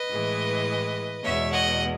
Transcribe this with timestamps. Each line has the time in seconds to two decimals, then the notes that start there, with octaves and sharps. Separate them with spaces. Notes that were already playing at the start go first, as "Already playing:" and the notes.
Already playing: B4 D#5
0.11 A2 E3 G#3
1.23 E2 B2 G#3 C#5 E5
1.52 D#5 F#5